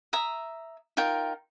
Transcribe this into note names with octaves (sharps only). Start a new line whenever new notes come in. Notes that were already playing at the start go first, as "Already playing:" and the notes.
E5 A#5 D#6
D#4 F4 A#4 G5